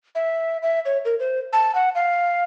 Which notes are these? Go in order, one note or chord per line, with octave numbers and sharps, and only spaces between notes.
E5
E5
C#5
A#4
C5
A5
F#5
F5